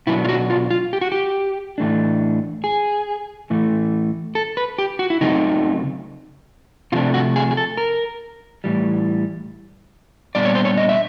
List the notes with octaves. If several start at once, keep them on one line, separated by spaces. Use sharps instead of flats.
B2 F#3 B3 D4 E4
F4
F#4
F4
F4
G4
F#4
G4
A2 E3 A3 D4
G#4
A2 E3 A3
A4
B4
G4
F#4
E4
C#3 F#3 A3 C4 D#4
C3 F3 A3 D4 F4
F#4
G#4
G#4
A4
A#4
A2 E3 G3
A#2 G3 B3 D4 D5
C#5
C5
C#5
D#5
E5